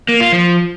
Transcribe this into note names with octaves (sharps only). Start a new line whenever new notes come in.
A#3
F4
F3